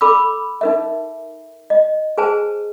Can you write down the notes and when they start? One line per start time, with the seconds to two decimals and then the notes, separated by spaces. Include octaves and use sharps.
0.01 A4 B5 D6 E6
0.61 D#4 A#4 E5
1.70 D#5
2.18 G#4 B4 C5 G#5 A5